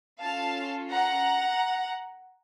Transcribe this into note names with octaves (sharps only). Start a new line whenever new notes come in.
C#4 F4 A4 F5 A5
F#5 A#5